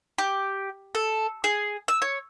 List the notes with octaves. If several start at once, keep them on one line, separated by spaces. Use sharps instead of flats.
G4
A4
G#4
E6
C#5